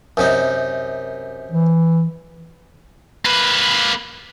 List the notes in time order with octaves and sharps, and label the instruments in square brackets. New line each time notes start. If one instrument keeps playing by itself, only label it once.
[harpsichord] F#2 C3 D#4
[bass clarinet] E3
[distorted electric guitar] A#3 B4